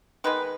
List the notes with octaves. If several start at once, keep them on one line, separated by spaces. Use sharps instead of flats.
D#3 G#3 B3 B4